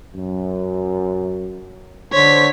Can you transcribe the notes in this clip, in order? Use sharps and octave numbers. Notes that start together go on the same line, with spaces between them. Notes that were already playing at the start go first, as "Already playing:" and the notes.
F#2
D3 C5 C#5 B6